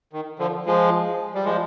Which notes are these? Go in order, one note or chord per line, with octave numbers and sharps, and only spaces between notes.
D#3
D3 F3
F3 G#3
G3
F3 G#3